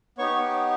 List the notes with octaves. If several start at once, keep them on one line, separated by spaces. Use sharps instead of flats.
B3 D#4 G4 C#5 C#6